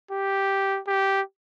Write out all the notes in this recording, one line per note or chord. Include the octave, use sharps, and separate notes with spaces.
G4
G4